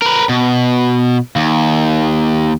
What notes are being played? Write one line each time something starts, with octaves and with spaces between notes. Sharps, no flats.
A#4 B4
B2
D#2